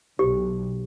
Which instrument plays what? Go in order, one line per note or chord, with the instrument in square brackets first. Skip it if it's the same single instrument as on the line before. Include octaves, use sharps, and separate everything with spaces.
[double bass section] B1 [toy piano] G4